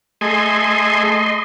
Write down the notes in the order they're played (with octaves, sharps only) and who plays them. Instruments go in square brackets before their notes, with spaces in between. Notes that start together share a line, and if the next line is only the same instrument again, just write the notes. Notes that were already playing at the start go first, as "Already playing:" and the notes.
[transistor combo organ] A3 G#4 [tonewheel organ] D#5 C6